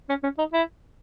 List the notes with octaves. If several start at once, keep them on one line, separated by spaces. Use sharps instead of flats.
C#4
C#4
D#4
E4